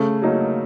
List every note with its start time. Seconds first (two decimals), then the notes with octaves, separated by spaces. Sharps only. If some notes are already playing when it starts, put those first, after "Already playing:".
Already playing: C#3 A3
0.22 F#3 A#3 D#4